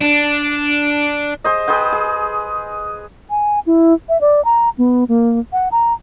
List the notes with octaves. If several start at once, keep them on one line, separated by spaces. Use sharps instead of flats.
D4
G#4 C5 D#5
G#4 B4 C5 G5
G#4
G#5
E4
E5
D5
A#5
B3
A#3
F#5
A#5